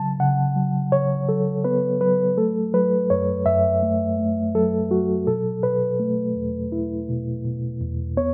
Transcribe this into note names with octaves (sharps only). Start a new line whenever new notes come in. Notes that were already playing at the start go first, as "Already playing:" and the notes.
Already playing: C#3 F#3 A5
C#3 F#5
F#3
C#3 C#5
F#3 A4
B3 B4
F#3 B4
A3 A4
F#3 B4
F#2 C#5
F#2 E5
A3
A3
F#3 A4
F#3 F#4
B2 A4
B2 B4
A3
E2
E4
B2
B2
E2
B3 C#5